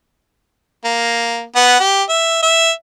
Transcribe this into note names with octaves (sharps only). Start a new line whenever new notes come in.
A#3
B3 F#5
G4
E5
E5